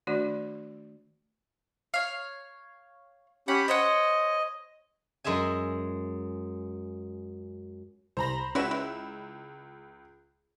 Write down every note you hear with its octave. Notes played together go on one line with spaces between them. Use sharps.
D#3 A3 D4 F#4 D5
C#5 F5
C#4 G4 F#5 B5
C5 C#5 D#5 F#5
F#2 G#3 G#4 E5 G#5
C2 C5 A#5 B5 A#6
C#2 C#4 E4 F#4 B4 E6 E7
E4